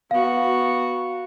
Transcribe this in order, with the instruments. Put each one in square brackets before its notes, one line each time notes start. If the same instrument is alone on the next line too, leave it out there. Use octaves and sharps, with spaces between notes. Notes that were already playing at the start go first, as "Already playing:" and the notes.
[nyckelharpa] B3 F#4 [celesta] F5